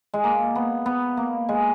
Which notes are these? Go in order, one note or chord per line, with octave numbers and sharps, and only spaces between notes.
G#3
A#3
B3
B3
A#3
G#3